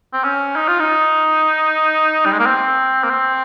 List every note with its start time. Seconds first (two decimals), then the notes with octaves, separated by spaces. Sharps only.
0.13 C4
0.24 C#4
0.56 D#4
0.68 F4
0.80 D#4
2.25 G3
2.32 G#3
2.39 A#3
2.46 C4
3.03 A#3
3.10 C4